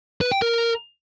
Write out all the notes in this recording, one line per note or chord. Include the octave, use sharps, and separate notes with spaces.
B4
G5
A#4